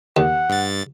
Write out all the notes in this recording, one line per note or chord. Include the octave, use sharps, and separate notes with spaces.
D#2 F#5
G2 A6